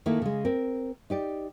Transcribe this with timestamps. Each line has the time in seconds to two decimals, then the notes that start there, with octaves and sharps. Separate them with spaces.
0.06 D#3 A3 A#3 E4
0.22 C#3 G#3
0.45 C4 A#4
1.10 D#4 G4 D5